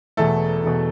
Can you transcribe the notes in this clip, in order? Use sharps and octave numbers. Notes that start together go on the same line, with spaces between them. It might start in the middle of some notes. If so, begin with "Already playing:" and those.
E1 E2 B2 A3 A4
E1 E2 B2